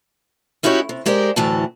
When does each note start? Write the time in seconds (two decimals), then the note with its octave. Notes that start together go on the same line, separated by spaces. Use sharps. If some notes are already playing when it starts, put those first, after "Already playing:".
0.63 C#4 D#4 E4 F#4 G4 C#5
0.89 C3
1.06 G#3 G4 A#4 C5 D5
1.36 D2 A2 E3 F#3 A5